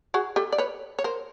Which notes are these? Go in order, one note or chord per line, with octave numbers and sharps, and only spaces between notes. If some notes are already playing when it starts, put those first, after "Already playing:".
F#4 G#4
G4 A4
D5
B4 C#5
C#5
A#4 C5